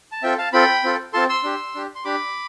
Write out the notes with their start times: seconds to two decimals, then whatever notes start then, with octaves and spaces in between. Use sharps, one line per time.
0.12 A5
0.23 C4 F4 A4 E5 G5
0.38 F5 A5
0.53 C4 F4 A4 G5 B5
0.83 C4 F4 A4
1.13 C4 F4 A4 A5 C6
1.29 C6 E6
1.44 D4 G4
1.75 D4 G4
1.95 C6
2.04 D4 G4 B5 D6